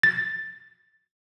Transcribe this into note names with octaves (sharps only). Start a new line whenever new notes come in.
A6